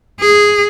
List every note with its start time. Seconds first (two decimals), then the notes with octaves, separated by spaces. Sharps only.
0.21 G#4